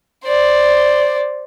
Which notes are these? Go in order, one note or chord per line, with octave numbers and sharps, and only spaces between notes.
C5 D5